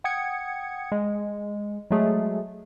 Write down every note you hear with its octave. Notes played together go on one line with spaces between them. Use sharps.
F#5 G5 D#6 G#6 C#7
G#3
F#3 G#3 A3 G#4